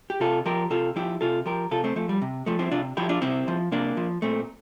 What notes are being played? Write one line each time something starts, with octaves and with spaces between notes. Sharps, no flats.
G4
C3 F4 A4
F3 G4 A#4
C3 F4 A4
F3 E4 G4
C3 F4 A4
F3 G4 A#4
C3 F4 A4
A3 C4
F3 A3
G3
C3
F3 A3
C4 E4
C3 D4 F4
F3 E4 G4
D4 F4
C3 C4 E4
F3
C3 A#3 D4
F3
A#2 A3 C4